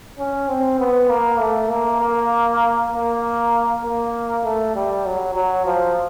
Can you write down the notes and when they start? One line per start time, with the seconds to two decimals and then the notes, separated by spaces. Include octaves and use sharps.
0.19 C#4
0.48 C4
0.79 B3
1.09 A#3
1.40 A3
1.70 A#3
2.01 A#3
2.92 A#3
3.83 A#3
4.44 A3
4.76 G3
5.06 F#3
5.35 F#3
5.66 F3